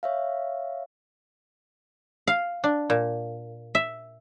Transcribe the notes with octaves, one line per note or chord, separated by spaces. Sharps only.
C#5 E5 F5
F5
D4
A#2
E5